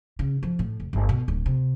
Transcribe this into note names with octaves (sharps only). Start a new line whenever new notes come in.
C#3
F3
A2
F1
G1
B2
D1
C3